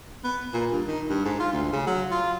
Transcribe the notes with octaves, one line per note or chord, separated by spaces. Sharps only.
B3
A#2
G2
D#3
G2
G#2
F4
D2
C#3
F#3
F4